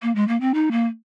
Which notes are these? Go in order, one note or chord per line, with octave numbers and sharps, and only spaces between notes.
A#3
G#3
A#3
C4
D#4
A#3